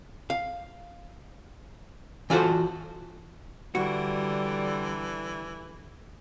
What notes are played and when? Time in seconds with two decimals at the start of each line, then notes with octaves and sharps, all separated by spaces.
0.30 F5
2.30 E3 F4 F#4 A4 C5
3.75 D3 E3 G3 F#4